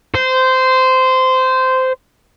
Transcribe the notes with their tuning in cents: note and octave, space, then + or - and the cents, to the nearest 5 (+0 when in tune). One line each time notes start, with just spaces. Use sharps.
C5 -15